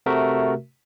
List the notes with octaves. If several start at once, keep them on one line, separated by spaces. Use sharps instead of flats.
C3 A3 F#4 A#4 E5